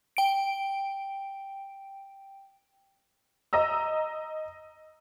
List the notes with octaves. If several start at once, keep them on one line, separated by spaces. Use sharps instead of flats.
G5 D7
D#5 A#5 E6